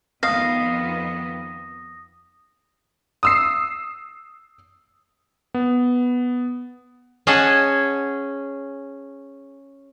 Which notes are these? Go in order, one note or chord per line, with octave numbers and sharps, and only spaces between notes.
F2 D#3 B3 F5 D#6 A#6
D#6 E6 C7
B3
C#4 G#4 D#5 F#5 A5